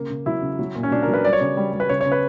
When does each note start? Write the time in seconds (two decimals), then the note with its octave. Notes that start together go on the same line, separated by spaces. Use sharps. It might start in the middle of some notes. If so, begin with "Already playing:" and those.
Already playing: C#3 A#3
0.10 C#3
0.26 F#3 E4
0.42 C#3
0.59 F#3
0.75 A#2
0.83 C#4
0.91 F#3 D4
1.03 A#4
1.08 F#3
1.13 B4
1.25 G3 D5
1.33 C#5
1.41 C#3 D5
1.57 G3
1.73 G3
1.80 B4
1.89 C#3 C#5
2.01 C#5
2.06 C#3
2.12 B4